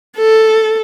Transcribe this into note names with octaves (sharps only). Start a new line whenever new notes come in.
A4